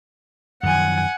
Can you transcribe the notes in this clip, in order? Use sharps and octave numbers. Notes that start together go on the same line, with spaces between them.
F#2 D#3 F3 F#5 G#5